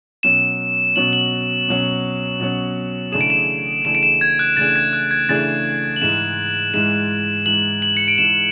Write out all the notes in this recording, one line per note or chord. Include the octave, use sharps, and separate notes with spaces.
B2 F#3 C#4 E7
B2 F#3 C#4 F#7
F#7
B2 F#3 C#4
B2 F#3 C#4
C#3 E3 A3 D4 G#4 E7
D7
E7
C#3 E3 A3 D4 G#4 E7
D7
E7
G#6
F#6
C#3 E3 A3 D4 G#4 A6
G#6
F#6
G#6
C#3 E3 A3 D4 G#4 A6
F#7
G#2 E3 G#3 E7
G#2 E3 G#3 E7
G#2 E3 G#3 F#7
F#7
C#7
D7
G#2 E3 G#3 E7